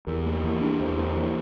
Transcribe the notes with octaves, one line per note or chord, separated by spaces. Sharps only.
E2 G4 A#4
A#3
E3 G4 A#4
D4
E2 A4 C5
A#3 A4 C5
E3 G4 A#4